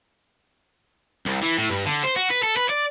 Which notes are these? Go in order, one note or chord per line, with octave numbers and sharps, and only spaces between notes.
C2
E3
A2
G2
D3
C5
F#4
B4
A4
B4
D5